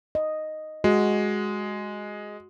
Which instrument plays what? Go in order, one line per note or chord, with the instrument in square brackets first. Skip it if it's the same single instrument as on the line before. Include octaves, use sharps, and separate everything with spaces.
[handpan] D#5
[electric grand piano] G#3 [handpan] F#4